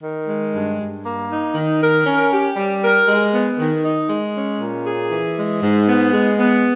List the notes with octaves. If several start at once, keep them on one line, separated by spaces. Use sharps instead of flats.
D#3
G#3
G2
G2
A#3
D#4
D#3
A#4
C#4
G4
G3
A#4
G#3
B3
D#3
D#4
G#3
C#4
A#2
G#4
E3
G#3
G#2
B3
G#3
B3